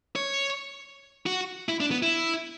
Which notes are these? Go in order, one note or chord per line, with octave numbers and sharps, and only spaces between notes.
C#5
F#4
E4
D4
B3
E4